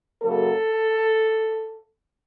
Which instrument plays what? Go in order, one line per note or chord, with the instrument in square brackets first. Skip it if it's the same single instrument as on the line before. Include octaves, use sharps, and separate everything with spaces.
[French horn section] F#2 C#3 F#3 A#3 A4